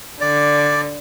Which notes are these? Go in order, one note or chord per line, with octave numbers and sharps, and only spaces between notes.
D3 D5